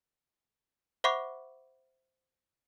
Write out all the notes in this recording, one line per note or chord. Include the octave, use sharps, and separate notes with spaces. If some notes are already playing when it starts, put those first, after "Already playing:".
C5 E5 F#5 B5 C#6 D6